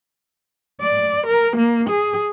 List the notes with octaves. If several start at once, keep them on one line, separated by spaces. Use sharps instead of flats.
D5
A#4
A#3
G#4